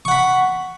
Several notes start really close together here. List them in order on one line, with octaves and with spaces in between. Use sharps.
C#6 F#5 B5